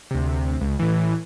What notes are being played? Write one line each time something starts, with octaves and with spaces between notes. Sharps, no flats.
D2 C3
C#2
A2 E3